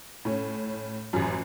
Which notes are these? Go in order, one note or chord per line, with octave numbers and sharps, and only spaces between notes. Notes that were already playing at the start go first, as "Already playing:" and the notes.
A2 C#4
A1 F#2